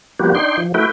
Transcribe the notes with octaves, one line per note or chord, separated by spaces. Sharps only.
F3 G3 A#3 B3 F#4 G4
D4 D#4 G5 C6
F3
A3 E4 F#4 B4 G5